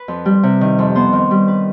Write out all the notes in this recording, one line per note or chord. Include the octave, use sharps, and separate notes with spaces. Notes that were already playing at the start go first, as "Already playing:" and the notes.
Already playing: B4
F2
G3
C3
D#3
F2
B3 C5
D#3
G3
B4